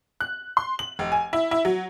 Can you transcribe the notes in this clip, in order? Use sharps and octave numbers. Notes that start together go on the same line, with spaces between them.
F#6
C6
F#7
F1
G#5
E4
E4
F#3